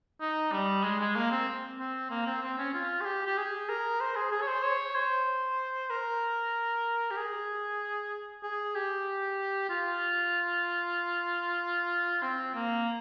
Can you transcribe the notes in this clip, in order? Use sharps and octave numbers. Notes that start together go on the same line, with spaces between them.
D#4
G3
G#3
G#3
A#3
C4
C4
A#3
C4
C4
C#4
F4
G#4
G4
G4
G#4
A#4
C5
G#4
G#4
C#5
C5
C#5
C5
A#4
G4
G#4
G#4
G4
F4
C4
A#3